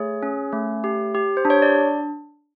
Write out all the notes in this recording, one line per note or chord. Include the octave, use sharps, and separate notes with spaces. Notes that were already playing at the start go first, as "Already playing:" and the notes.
Already playing: A3 G#4 C#5
C#4
A3
G4
G4
C5
D4
C#5
D5